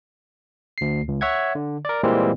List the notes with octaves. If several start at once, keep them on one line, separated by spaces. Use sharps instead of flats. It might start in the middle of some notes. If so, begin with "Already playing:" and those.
D2 C7
C#2
C#5 E5 F#5 G#6
D3
A#4 D5
A#2 E3 G3 G#3 A#3 C4